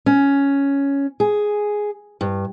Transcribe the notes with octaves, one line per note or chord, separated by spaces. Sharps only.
C#4
G#4
G2